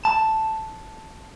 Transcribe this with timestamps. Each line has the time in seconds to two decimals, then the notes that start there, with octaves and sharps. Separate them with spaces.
0.05 A5